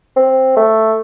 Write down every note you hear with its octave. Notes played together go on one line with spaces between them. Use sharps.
C4
A3